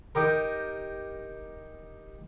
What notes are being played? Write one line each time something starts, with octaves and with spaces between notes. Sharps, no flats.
D#4 G4 A#4